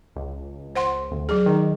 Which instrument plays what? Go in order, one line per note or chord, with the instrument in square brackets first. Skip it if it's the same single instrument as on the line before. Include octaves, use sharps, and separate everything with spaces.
[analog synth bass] C#2
[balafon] C5 F#5 C6
[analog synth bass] D2
[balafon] F#3 G#4
[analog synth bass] D#3